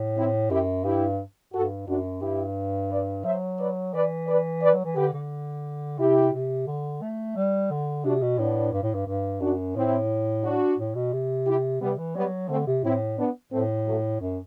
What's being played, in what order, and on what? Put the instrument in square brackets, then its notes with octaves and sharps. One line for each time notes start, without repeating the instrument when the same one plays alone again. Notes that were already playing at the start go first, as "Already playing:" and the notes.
Already playing: [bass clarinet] A2
[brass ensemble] C4 E4
[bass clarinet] F#2 [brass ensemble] E4 G4
[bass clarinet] G2 [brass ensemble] E4 G4
[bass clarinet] G2 [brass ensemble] F#4 A4
[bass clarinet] F#2 [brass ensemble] D4 F#4
[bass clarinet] G2 [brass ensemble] E4 G4
[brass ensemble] B4 D5
[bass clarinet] F#3 [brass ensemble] C5 E5
[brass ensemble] B4 D5
[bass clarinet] E3 [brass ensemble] B4 D5
[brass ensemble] B4 D5
B4 D5
[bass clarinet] F#3
E3
[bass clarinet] D3 [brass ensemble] G4 B4
[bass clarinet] D3
[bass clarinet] C3 [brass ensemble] E4 G4
[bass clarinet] C3
D3
A3
G3
D3
[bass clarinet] C3 [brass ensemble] D4 F#4
[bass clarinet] B2
[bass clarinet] A2 [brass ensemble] B3 D4
[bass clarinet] G2
A2
G2
G2
[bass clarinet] F#2 [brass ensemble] D4 F#4
[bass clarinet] A2 [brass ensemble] C4 E4
[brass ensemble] D4 F#4
[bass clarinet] A2
B2
C3
[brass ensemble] E4 G4
[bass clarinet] C3 [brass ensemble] G3 B3
[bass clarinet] E3
[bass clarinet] F#3 [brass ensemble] G3 B3
[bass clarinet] D3 [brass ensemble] A3 C4
[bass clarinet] C3
[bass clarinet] A2 [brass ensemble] C4 E4
[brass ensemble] B3 D4
[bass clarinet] A2 [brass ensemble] A3 C4
[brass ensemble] F#3 A3
[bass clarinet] F#2